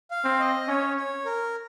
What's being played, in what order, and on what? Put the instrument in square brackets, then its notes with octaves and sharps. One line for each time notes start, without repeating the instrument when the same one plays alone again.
[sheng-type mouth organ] F5
[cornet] C4
[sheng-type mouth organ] D#5
[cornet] C#4 [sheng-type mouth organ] C#5
[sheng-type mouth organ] C#5
A#4